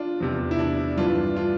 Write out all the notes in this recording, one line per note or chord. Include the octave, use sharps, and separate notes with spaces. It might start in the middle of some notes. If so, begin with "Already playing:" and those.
Already playing: D4 F4
E2 C3 F3
E4
D4
G2 E3 D4 F4
D4 F4